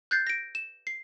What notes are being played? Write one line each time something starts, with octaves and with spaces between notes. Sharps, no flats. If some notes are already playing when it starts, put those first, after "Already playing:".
F#6 G6 A6 C7
A#6 D7
E7
C7